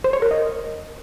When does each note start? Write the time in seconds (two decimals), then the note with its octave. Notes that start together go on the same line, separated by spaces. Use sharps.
0.04 C5
0.13 C#5
0.22 A#4
0.31 D#5